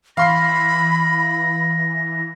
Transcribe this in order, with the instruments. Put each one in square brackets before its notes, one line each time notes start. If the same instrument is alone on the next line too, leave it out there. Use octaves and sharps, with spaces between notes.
[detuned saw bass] E3 [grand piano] F5 C6 C7 [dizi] B5 [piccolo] A#6